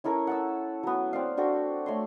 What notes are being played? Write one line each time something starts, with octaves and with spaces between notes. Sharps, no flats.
C#4 E4 A4 A#4
F#5 A5 E6
F#3 B3
C4 D5 F5
C4 D4 F#4 A4
A3 C#5 C6